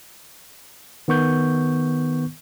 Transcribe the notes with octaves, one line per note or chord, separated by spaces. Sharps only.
D#3 B3 C#6 G6